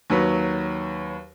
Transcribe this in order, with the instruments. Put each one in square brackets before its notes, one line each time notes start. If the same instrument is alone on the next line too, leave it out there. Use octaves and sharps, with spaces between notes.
[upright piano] D#2 F#3 B4